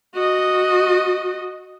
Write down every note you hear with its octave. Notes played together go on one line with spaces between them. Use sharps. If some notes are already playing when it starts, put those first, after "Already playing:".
F#4 D#5